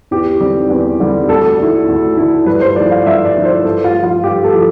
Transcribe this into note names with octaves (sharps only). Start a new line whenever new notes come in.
E2 G4
D3 G3 C4
E2
D3 G3 C4
D2 A4
D3 A3 E4
D2
D3 A3 E4
G2 B4
C5
F3 A3 E4 D5
F5
G2 E5
D5
F3 A3 E4
C5
G2 A4
F4
A3
F3 F4
G2 G4
A4
F3 A3